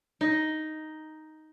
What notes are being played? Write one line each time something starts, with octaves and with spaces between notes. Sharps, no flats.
D#4